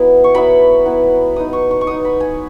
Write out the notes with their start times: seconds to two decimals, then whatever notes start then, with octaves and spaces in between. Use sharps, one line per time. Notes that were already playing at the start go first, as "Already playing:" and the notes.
Already playing: F#3 B3 E4
0.24 C#6
0.35 F#3 B3 E4 B5
0.86 F#3 B3 E4
1.36 F#3 B3 D#4 D#6
1.53 C#6
1.71 C#6
1.81 C#6
1.87 F#3 B3 D#4 D#6
2.05 B5
2.20 G#5